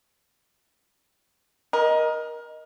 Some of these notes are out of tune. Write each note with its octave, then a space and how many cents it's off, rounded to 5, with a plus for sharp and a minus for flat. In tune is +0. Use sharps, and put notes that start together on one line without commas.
A#4 +25 D#5 +0